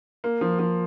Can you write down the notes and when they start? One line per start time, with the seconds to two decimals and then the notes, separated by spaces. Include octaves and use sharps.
0.24 A#3
0.41 F3
0.59 F3